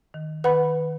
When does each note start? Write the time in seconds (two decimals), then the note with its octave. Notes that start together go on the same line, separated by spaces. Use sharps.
0.14 D#3
0.44 D#3 B4 F#5 B5